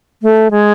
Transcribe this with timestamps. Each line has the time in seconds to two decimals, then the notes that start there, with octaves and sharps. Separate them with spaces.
0.22 A3
0.51 G#3